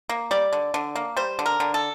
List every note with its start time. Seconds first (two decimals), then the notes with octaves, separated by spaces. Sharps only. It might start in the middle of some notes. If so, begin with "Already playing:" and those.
0.09 A#3
0.31 G3 D5
0.53 D3
0.74 D3
0.96 A#3
1.17 G3 C5
1.39 D3
1.46 A#4
1.60 D3
1.74 A4